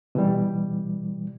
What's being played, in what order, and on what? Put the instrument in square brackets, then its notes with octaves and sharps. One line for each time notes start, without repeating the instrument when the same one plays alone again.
[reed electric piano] B2 E3 G3